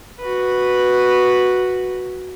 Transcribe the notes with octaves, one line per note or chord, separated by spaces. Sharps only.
F#4 B4